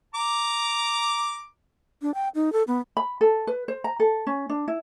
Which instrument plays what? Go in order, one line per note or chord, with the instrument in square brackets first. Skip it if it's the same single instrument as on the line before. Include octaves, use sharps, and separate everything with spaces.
[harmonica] A#5 D6
[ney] D4
G5
D#4
A4
B3
[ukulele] B5
A4
B4
C5
A#5
A4
C#4
D4
E4